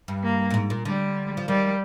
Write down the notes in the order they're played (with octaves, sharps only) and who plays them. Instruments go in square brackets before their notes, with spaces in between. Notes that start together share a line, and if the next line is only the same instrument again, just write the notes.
[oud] G2
[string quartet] A#3
[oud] A#2
G#2
A#2
[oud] D3 [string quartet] G3
[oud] F3
[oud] D#3 [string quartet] G3